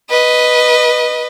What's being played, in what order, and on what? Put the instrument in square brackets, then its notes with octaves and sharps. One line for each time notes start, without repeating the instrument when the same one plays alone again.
[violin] B4 D#5